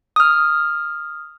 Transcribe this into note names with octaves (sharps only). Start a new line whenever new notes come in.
D#6 F6